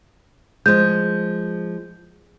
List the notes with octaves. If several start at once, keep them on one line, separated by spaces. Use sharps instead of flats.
F3 G#3 G6